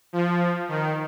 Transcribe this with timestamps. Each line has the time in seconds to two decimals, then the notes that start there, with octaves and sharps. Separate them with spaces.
0.13 F3
0.68 D#3